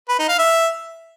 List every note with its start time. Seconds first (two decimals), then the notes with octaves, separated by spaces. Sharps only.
0.09 B4
0.19 D#4
0.29 F5
0.39 E5